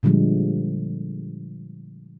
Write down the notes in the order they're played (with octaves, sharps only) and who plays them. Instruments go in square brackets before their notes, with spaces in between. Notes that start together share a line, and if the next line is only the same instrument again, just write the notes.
[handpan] A#2 D3 F3 G3 G#3